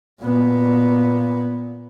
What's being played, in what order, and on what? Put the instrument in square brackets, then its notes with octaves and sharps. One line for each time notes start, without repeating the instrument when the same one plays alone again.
[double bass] A#2 B3